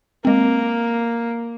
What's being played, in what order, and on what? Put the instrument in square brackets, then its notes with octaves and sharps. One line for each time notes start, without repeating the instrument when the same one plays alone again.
[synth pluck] G#3 C4 [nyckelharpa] A#3